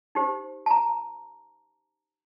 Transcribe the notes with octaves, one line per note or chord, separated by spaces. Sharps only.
D#4 G4 C5
A5
A#5